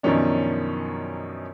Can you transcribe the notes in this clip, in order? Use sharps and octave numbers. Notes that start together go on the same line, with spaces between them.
F#2 B2 D#3 F3 C#4 D4